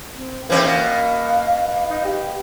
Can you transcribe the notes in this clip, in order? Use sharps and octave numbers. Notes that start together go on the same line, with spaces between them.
C4
E3 A#3 C4 C#4 B4
B2 F5
D#4
G4